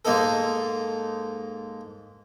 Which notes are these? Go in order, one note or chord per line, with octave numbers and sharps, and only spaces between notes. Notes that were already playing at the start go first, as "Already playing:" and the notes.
G#2 A#3 D#4 A4